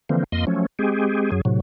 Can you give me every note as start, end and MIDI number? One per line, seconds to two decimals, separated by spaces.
0.09 0.24 50
0.09 0.24 52
0.09 0.24 53
0.09 0.24 58
0.09 0.24 60
0.32 0.45 41
0.32 0.45 58
0.32 0.45 75
0.32 0.45 84
0.47 0.66 53
0.47 0.66 54
0.47 0.66 57
0.47 0.66 61
0.79 1.31 56
0.79 1.31 60
0.79 1.31 67
0.79 1.31 68
1.32 1.41 42
1.32 1.41 54
1.32 1.41 68
1.45 1.60 45
1.45 1.60 48
1.45 1.60 54